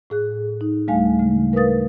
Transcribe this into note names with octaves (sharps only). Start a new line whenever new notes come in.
A2 G#4 F#6
D#4
D2 G3 A3 F5 G#5
C#3 G#3
A#4 B4 F5 D#6 A6